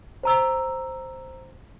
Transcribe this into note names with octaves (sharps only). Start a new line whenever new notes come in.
C5 A#5 E6